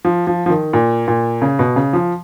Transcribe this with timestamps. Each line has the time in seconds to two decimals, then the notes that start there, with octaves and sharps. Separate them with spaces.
0.05 F3
0.27 F3
0.46 F3
0.50 D#3
0.73 A#2
1.08 A#2
1.42 C#3
1.59 B2
1.76 C#3
1.93 F3